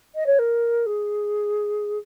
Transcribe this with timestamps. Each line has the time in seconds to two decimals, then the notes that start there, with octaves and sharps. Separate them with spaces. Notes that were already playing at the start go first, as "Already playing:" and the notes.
0.15 D#5
0.26 C#5
0.38 A#4
0.86 G#4